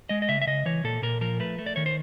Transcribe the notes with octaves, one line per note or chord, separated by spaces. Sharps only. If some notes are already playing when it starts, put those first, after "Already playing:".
G#3 D#5
D#5
C#3 E5
E5
C#3 D#5
E3 C#5
A#2 A4
A#2 A#4
F3 A#4
A3 B4
A3
D5
D#3 C#5
C5